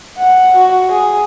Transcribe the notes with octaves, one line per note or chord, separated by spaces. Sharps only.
F#5
F#4
G#4